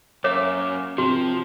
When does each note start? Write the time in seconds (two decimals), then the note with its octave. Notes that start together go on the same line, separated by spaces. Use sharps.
0.24 F#2 A#3 C#5 E5 D6
0.98 C3 F3 F#4